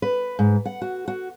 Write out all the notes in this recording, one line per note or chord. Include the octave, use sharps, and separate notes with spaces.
B4
G#2
F#5
F#4
F#4